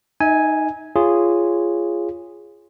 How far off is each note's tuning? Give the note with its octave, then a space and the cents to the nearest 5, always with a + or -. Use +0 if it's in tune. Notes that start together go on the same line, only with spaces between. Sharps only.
D#4 +0 E5 -40 G#5 +0
F4 -15 G#4 -10 C#5 +0